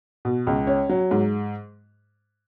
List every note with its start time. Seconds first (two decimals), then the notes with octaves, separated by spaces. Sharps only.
0.25 B2
0.47 C#2
0.67 C#4
0.89 F#3
1.11 G#2